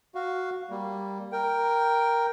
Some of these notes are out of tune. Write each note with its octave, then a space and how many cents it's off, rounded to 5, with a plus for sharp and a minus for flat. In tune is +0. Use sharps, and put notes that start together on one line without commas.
F#4 +0 F5 +0
G3 +0 A#3 +0
A#4 +0 G5 +0